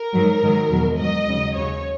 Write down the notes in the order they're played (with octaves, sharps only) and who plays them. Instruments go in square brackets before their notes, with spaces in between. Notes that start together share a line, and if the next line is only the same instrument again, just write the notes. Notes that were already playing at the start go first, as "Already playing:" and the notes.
Already playing: [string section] A#4
G#2 D#3 F#3
G#2 D#3 F#3
E2 B2 F#3
G#2 F#3 D#5
D#2 C#3 F#3
D#2 C#3 F#3 C#5